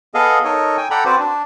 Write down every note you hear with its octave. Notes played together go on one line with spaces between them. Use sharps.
B3 G#4 A4 D#5 F5
D#4 A4 A#4 C#5 D#5
G5 G#5
A4 D5 F#5 G5 A#5 B5
C4 F#4 B4 C5 D5
D4